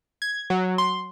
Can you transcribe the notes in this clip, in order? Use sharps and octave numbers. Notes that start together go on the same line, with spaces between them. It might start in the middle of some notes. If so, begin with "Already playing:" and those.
G#6
F#3
C6